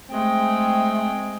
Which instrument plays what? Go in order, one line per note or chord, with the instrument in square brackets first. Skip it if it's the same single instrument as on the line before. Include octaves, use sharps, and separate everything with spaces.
[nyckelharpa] G#3 G5 [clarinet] A3 [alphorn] C4